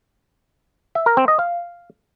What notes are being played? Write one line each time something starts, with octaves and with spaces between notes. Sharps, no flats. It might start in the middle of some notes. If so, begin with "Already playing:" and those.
E5
A#4
C4
D#5
F5